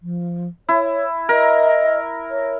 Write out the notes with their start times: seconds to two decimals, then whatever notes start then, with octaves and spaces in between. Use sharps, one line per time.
0.02 F3
0.69 E4 C#5
1.29 A#4 D#5
2.31 C#5